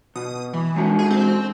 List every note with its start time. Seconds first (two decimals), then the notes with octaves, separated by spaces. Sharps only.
0.16 B2 D#6
0.53 E3
0.76 G#3 C#4 F#4
0.99 G#4
1.10 C4